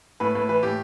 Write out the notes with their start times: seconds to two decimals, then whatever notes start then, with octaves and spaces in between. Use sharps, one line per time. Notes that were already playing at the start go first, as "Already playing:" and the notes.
0.20 A2 B4
0.35 A2 B4
0.49 E3 B4
0.63 A2 G4